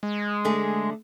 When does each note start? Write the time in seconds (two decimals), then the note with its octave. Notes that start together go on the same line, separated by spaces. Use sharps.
0.03 G#3
0.45 D3 A3 G#4